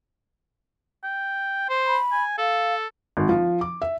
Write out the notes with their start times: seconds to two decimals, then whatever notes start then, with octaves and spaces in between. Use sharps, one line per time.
1.04 G5
1.70 C5
1.87 B5
2.12 G#5
2.38 A4 F5
3.17 G#1
3.29 F3
3.61 D6
3.82 E5